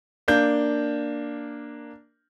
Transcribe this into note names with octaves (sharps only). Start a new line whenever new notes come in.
A#3 D4 G6